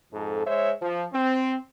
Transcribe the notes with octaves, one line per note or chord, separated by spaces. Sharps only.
F2 G#2 A4
G#3 C5 C#5 E5
F3
C4